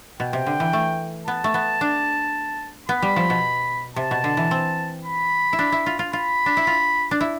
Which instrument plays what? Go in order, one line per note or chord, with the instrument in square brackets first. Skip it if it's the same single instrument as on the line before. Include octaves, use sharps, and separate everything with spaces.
[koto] B2 [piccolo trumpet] G5
[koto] C3
D3
E3
A3
[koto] B3 [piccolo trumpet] A5
[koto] A3
B3
D4
[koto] B3 [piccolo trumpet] B5
[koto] G3
F3
B2
[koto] C3 [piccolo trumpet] A5
[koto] B2
D3
E3
C4
[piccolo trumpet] B5
[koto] E4
D4
E4
F4
F4
[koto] F4 [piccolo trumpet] B5
[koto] D4
E4
F4
D4
E4